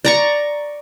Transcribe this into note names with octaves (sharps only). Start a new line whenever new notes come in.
D5 A#5 C#6